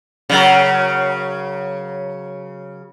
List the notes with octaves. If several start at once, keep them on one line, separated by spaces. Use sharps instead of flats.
C#3 F#3 A#4